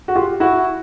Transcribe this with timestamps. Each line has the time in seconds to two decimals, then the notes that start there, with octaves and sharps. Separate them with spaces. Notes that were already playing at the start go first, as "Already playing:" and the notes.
0.08 F#4
0.16 F4 G4
0.40 E4 F#4